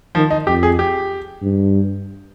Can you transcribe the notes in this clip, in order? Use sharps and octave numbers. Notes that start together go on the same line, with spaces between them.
D#3 F3
D#4
F2 G4
G#4
G4
G2